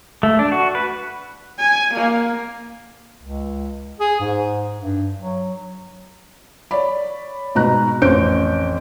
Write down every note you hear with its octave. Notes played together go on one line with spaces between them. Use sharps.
A3
D4
F#4
B4
G#5
A#3
C#2
G#4
G#2
G2
F#3
C#5 D5 B5
G#2 B2 A#5 F#6
A1 F2 C#4 C5 G6 D7